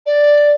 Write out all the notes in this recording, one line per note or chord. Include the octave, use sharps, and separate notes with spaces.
D5